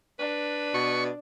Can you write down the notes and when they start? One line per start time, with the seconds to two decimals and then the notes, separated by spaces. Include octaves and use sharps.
0.19 D4 B4
0.74 B2 C#6